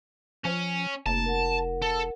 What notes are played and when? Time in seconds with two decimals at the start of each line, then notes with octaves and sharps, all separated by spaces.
0.45 F3 C#4
1.06 F1 A#3 A5
1.26 A#4 F#5
1.82 A4